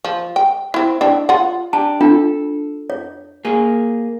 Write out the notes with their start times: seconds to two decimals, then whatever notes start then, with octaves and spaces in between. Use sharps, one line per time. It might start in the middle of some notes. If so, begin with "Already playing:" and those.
0.04 F3
0.36 G5
0.74 C4 E4
1.01 D4 E4 G5
1.29 F4 F#5
1.73 D4 G4 A5
2.01 D4 F4 A4
2.90 C#5
3.45 A#3 G#4